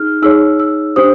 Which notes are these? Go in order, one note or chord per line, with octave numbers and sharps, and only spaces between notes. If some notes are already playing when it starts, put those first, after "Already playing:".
Already playing: D#4 G#4 F6
D#4 G#4 C#5 E6
E6
D4 G4 C5 D#6